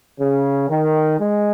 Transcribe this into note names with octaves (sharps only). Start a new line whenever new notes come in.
C#3
D#3
G#3